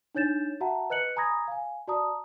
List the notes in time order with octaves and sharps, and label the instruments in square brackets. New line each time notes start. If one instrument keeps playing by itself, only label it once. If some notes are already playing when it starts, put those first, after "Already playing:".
[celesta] D4 D#4 C#5 G6 A6 E7
F#4 E5 F#5 A5 A#5
B4 D#5 F#6 C#7 F#7
G#5 A#5 B5 D#6 G#6 A#6
F5 G#5
F#4 D5 A5 A#5 D#6